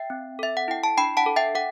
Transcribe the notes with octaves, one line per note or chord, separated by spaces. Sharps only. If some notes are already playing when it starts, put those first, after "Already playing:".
Already playing: E5 G5
C4
A4 E5
F#5
E4 G5
A5
D4 G5 B5
F#5 A5
A4
E5 G5
A4 F#5